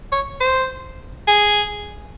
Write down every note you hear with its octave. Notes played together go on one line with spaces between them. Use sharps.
C#5
C5
G#4